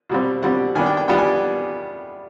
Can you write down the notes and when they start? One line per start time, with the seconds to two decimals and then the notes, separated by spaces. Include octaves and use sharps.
0.09 B2 G3 C4
0.42 B2 G3 C4 F#5
0.75 D#3 G3 B3 D4 G#5
0.86 G5
0.97 G5
1.08 D#3 G3 B3 D4 G5
1.18 G#5